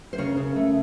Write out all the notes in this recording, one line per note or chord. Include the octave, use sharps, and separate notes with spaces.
C5
C#3 A#4 C#5
C#3
A3